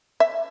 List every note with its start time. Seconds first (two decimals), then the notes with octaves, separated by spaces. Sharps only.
0.20 E5